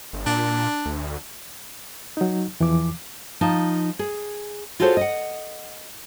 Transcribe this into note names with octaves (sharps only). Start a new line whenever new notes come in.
G1
A#2 D4
D2
F#3 D#4
E2 E3 F3 D6
F3 D#4 A5
G#4
F4 F#4 G#4 A4 C5 C#5
D#5 F#5